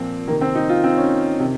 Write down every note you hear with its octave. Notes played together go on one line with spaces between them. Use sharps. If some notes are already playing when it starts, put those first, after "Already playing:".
Already playing: A#2 F3 C4
C3 D#3 A#3
C4
D#4
F4
C4
C#4
C3 D#3